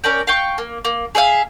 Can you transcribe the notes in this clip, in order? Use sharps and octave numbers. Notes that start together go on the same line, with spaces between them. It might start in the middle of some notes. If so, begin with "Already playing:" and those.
C#4 A#4 D5 G5
F5 G5 C#6
A#3
A#3
G#4 D5 E5 F5